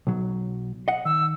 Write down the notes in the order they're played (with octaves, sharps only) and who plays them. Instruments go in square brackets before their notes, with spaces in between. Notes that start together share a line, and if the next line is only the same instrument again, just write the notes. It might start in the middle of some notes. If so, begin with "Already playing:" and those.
[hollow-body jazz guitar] B1 F#3
D#5 F#5
[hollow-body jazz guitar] D#3 [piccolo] E6